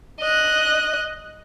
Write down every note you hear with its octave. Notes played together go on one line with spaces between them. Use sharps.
D#5 F#6